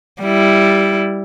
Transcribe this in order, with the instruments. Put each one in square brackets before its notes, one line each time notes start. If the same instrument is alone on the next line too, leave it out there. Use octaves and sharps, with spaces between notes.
[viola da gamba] G3 E4